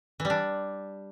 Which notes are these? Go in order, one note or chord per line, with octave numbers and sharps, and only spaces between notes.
E3
G3
D4